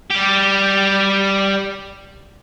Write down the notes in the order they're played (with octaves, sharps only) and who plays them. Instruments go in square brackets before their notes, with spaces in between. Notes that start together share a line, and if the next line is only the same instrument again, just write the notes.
[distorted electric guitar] G3 G4